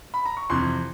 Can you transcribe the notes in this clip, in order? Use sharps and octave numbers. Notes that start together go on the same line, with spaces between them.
B5
A#5
C#6
F2 C3 E3 C6